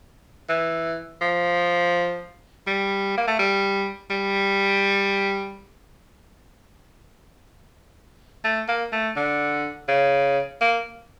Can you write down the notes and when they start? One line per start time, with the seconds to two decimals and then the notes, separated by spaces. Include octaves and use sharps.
0.49 E3
1.21 F3
2.67 G3
3.17 A#3
3.27 A3
3.39 G3
4.10 G3
8.45 A3
8.68 A#3
8.92 A3
9.16 D3
9.88 C#3
10.61 A#3